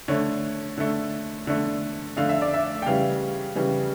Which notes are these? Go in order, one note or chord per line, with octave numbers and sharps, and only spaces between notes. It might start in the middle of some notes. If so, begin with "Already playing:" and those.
D3 A3 C#5
D3 A3
D3 A3
D3 A3 F5
E5
D5
E5
G5
C#3 E3 G3 F5
C#3 E3 G3